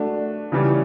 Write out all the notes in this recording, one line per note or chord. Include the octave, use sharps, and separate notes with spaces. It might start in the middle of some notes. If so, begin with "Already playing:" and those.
Already playing: A3 D4 F#4
C#3 E3 G3 C#4